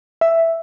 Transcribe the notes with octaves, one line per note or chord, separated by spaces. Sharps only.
E5